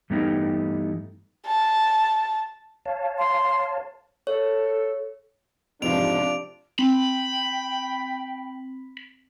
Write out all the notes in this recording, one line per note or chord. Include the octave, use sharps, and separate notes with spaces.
G2 E3 A3 B3 D#4 G4
A5
C#5 F5 A5
C6
A4 C#5
F2 G#2 C3 E3 F3 D4 D7 F7
C4 G5 B5